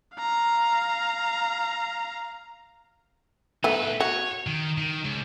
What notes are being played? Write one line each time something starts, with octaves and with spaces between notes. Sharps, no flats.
F5 A#5
A3 B3 D#4 B4
F#4 C#5
D#3
D#3
C#2